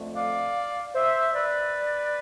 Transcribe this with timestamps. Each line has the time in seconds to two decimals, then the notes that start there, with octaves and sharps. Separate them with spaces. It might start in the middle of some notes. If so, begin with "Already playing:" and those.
Already playing: F2 D3 A3
0.15 D5 F5
0.94 C5 E5
1.34 B4 D5